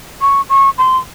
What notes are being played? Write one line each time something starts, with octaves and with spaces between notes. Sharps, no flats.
C#6
C#6
C6